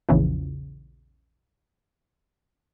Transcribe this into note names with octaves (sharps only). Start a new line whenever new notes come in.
A#1 E2 C#3 E3 F3